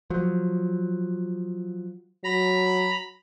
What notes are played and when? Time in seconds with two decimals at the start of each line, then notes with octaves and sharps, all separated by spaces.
0.10 F3 F#3
2.24 F#3 A#5 B5